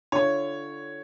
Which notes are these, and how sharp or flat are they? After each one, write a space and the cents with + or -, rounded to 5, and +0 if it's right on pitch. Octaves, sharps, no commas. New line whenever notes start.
D3 +0 F4 -35 C#5 +0